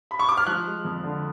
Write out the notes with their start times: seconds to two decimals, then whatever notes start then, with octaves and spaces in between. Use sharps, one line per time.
0.11 B5
0.19 C#6
0.29 D6
0.37 F6
0.47 F3 F#6
0.66 G#3
0.85 F2
1.04 D3